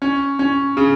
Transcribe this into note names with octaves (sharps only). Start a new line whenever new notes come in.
C#4
C#4
C#3